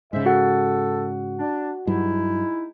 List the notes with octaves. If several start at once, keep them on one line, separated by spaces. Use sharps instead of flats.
G#2 C#3 G#3 C5 E5
F#4 A4 F#5
D4
G2 F#3 G#3 D#4 E4